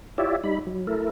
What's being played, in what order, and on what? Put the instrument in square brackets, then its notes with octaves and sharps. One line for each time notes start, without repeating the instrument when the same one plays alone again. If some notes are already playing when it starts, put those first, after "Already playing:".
[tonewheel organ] E4 F4 G4 C#5 D5 E5
G3 D#4 B5
F#3
A3 E4 A4 A#4